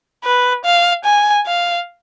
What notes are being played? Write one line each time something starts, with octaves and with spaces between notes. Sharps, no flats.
B4
F5
G#5
F5